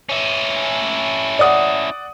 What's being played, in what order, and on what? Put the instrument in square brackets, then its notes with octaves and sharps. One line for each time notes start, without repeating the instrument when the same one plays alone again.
[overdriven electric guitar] C#4 E4
[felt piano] D5 F#5 D#6